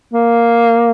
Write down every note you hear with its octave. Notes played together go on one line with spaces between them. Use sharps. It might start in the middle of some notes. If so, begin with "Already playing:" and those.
A#3